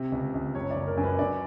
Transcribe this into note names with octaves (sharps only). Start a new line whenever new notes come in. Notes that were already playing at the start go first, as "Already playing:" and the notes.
Already playing: C3
C#2
C#2
F#1 C#5
D5
F#1
A#4
F#2
B4
F#2 D5